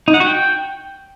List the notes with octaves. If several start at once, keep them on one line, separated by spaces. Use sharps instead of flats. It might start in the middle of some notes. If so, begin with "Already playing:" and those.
D#4
F#5
F#4
G5